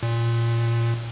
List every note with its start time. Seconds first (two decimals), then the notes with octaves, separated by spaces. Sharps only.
0.03 A#2